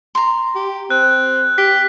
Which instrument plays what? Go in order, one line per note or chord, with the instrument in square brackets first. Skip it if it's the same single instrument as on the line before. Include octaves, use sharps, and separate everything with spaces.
[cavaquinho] A#5 C6
[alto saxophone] G4
[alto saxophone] C4 [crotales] F#6
[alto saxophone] G4 [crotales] B6